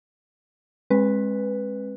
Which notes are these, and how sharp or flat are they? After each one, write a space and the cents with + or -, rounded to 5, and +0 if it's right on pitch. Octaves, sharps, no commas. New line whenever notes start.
G#3 -10 C4 +35 B4 +0